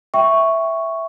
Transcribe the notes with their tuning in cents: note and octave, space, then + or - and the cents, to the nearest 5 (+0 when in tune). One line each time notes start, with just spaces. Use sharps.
E5 +0 G5 +0 C#6 +0